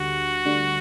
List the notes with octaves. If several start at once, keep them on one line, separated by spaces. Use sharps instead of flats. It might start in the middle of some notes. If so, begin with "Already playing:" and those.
Already playing: D2 D3 G3 F#4
D2 D3 G3